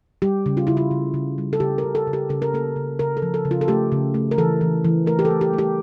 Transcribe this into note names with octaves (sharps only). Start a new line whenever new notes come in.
G3 G4
C#3
F4
C#3 E4
F4
C#3
C#3
G3
A4
C#3 G4
A#4
C#3
A4
C#3
G4
C#3 A4
A#4
A#3 A4
C#3
C#3 A#4
A4
F3
A4
C#3
F4
A4
A3 G4
C#3
A3
A#4
E3 A4
E3
E3
A3 A#4
G4
A4
A3
G4
A3
G4